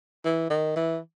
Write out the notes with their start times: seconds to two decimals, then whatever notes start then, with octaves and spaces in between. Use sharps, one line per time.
0.25 E3
0.50 D#3
0.76 E3